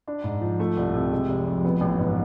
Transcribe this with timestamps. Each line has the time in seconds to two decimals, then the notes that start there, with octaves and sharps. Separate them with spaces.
0.08 D4
0.24 G#2
0.41 F3
0.60 A3
0.77 C2
0.94 C3
1.12 G#3
1.29 F1
1.46 F2
1.65 B3
1.81 A1
1.99 G#2